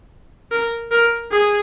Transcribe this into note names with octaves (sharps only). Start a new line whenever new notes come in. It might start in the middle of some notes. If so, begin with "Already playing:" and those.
A#4
A#4
G#4